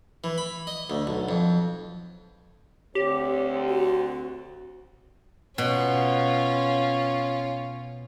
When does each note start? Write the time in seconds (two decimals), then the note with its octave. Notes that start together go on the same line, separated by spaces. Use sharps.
0.24 E3
0.38 B5
0.67 D#5
0.90 D2
1.07 B1
1.29 F2
2.95 D2 C4 G4 C#5
3.69 F#4
5.58 B2 C#4 F4